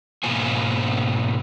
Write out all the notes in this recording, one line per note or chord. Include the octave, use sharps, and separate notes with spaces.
G#2 B2 A#3 F4 C5 G#5